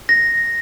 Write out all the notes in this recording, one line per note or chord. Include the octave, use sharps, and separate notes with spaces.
A#6